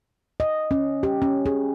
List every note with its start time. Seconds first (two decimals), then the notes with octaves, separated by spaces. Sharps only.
0.40 D#5
0.71 C#4
1.03 G4
1.22 C#4
1.46 G#4